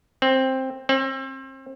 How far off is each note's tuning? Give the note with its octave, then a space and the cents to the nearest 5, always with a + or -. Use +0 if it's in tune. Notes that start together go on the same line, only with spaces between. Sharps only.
C4 +10
C4 +35